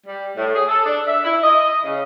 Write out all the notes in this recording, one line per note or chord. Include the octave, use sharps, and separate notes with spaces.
G3
A2
G#4
A4
D4
E5
E4
D#5
C#3